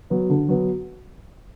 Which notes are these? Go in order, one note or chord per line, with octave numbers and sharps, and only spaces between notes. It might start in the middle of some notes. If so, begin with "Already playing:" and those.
F#3 B3
D3
F#3 B3